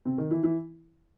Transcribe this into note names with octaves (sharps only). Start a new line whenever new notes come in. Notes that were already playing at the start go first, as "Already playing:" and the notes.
C3 C4
D#3 D#4
E3 E4
E3 E4